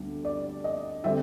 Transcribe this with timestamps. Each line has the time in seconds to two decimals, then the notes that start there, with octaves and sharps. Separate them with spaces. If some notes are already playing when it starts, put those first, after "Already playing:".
Already playing: D2 D3 G3 B3 D4
0.25 D5
0.64 D#5
1.04 D3 G3 C4 E5